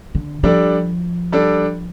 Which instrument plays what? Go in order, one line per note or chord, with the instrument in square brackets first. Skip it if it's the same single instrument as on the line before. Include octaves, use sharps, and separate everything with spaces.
[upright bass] D3
[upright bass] F3 [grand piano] G3 D4 A4 D5
[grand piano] G3 D4 A4 D5